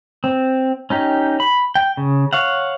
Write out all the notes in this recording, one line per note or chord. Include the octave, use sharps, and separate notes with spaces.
C4
C#4 D#4 G4
B5
G5
C#3
C#5 F5 F#5